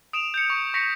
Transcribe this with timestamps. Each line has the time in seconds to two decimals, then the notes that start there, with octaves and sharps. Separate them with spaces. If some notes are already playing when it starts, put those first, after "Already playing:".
0.13 D#6 D7 E7 F7
0.34 G6 C#7
0.50 C#6
0.74 C#6 A#6 B6 C#7